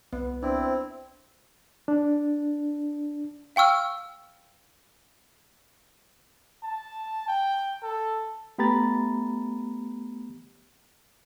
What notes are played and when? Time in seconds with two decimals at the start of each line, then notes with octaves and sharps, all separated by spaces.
0.13 C2 B3
0.43 C4 D4 E4 C5
1.88 D4
3.56 F5 G5 C#6 E6 F6
6.63 A5
7.28 G5
7.83 A4
8.58 A3 B3 G4 A#5 B5 A6